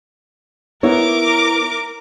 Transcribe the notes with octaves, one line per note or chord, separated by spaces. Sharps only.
B3 E4 A#4 C#5 D6